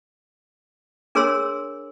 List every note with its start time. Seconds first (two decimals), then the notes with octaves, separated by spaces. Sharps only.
1.15 D4 G#4 A#4 C#5 C6 E6